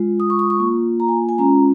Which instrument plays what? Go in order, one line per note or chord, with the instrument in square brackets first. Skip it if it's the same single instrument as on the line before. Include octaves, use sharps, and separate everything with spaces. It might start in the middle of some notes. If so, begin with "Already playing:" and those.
Already playing: [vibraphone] G#3 F4
D#6
C#6
D#6
C#6
A#3 F4
A#5
G#5
G#5
G#3 C#4 F4 A#5